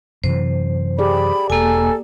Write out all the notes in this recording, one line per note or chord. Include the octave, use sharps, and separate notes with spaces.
F#2 C3 E3 C5
G4 G#4 D5 B5
E1 A#3 A4 G#5